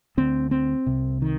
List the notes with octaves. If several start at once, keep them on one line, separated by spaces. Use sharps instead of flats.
D2 D3 C4
C4
C2 C3
D#3